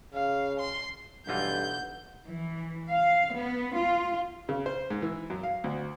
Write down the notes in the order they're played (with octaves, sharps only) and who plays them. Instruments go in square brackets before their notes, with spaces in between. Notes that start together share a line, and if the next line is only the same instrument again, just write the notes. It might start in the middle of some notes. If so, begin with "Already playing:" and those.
[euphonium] C#3 [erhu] F5
[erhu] C6
[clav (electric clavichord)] B1 E3 F4 [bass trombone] G2 [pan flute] F#5 [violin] G6
[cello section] E3
F5
B3
F4
[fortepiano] C#3
C5
G#2
E3
F#2
F5
D2